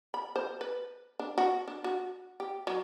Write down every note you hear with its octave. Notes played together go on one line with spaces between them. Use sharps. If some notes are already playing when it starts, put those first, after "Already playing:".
B5
C5
B4
D4
F#4
D4
F#4
G4
F#3